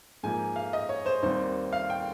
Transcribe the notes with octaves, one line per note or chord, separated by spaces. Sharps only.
G#2 F3 A#3 G#5
F5
D#5
C#5
C5
D#2 D#3 G3 C4 C5
F5
G5